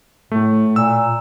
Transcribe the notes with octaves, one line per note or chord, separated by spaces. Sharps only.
A2 A3
A#2 E6